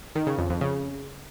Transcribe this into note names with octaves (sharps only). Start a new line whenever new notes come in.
D#3
C#3
F2
F2
C#3